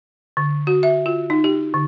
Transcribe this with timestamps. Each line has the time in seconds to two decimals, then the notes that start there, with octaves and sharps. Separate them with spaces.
0.37 D3
0.67 F#4
0.83 E5
1.06 F4
1.30 D#4
1.44 G4
1.74 D3